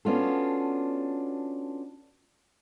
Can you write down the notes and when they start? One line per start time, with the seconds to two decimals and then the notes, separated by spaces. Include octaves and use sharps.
0.05 B3 C#4 D4 F4 F#4 A4